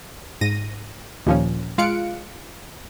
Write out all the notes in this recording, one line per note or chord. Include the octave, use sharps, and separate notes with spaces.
G#2 A#6 D#7
D#2 A#2 F3 A#3 C#4
G#3 F4 F5 F#6 C#7 D7